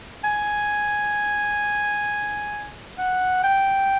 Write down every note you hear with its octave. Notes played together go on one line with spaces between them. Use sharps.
G#5
F#5
G5